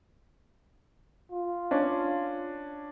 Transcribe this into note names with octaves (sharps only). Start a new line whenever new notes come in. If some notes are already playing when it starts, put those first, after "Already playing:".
F4
C#4 D4